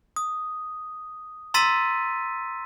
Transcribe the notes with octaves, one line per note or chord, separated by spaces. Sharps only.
D#6
A#5 C6 E6 A6 B6 D#7